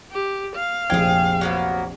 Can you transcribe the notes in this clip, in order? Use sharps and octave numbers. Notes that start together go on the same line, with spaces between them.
G4
F5
F1 A#1 G#4 G5 G#6
F#3 A#3 B3